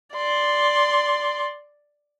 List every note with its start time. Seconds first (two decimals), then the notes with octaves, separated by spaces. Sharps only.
0.14 D5 C6